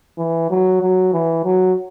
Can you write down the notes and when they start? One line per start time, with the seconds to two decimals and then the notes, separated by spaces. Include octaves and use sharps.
0.18 E3
0.50 F#3
0.81 F#3
1.13 E3
1.44 F#3